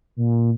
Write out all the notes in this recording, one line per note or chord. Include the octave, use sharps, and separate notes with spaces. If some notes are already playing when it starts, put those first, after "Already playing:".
A#2